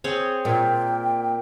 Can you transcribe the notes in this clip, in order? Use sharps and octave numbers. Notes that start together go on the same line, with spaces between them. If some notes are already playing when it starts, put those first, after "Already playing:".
C4 G#4 C#5
A#2 G5